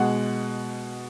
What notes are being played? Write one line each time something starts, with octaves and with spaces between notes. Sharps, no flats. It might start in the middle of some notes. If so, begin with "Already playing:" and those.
Already playing: B2 G#3 F#5